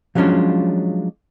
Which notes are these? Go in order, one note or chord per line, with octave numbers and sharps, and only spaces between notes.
F3 F#3 G#3 C#4 D4 F4